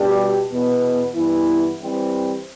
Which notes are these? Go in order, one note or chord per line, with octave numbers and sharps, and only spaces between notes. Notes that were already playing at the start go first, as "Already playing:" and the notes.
Already playing: B2 G3 D4 G4
E2 B2 B3
G2 E3 B3 E4
E3 G3 C4